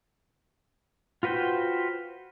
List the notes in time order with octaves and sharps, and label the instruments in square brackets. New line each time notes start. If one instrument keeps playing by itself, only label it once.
[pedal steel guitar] F4 F#4 B4 C5 G5